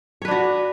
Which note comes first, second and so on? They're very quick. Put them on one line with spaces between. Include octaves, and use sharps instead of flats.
C#5 B4 D4 F#4